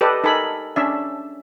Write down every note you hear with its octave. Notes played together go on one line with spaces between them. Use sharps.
G4 A4 B4 D5 D#5
D#4 A4 A#4 G#5 B5
C#4 D4 E5